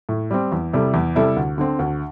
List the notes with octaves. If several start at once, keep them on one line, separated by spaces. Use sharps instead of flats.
A2
G3 C4
E2
C3 G3 E4 A4
E2
C3 G3 E4 A4
D2
D3 C4
D2